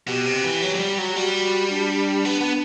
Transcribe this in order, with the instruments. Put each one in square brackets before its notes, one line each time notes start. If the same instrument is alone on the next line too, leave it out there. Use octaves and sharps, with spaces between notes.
[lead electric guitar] B2 [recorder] G4
[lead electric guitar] C3
E3
F#3
F#3
G3
F#3
[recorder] G4
[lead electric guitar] G3 [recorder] F#4
[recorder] D4
[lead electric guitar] B3
B3